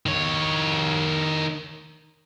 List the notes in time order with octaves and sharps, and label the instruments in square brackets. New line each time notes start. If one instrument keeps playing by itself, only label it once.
[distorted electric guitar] D#3 C#5